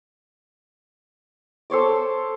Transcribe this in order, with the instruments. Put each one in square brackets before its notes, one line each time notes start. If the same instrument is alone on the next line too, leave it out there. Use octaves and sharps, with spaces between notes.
[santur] A4 C5 C#5 D6